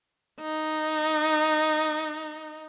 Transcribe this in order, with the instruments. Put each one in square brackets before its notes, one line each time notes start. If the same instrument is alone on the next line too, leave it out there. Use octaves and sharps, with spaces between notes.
[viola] D#4